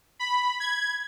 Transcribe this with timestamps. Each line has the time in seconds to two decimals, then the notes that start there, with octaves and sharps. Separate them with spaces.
0.19 B5
0.60 G#6